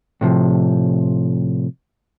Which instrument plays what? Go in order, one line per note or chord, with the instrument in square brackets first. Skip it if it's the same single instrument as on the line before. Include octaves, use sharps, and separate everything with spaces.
[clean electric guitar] A2 C3 F3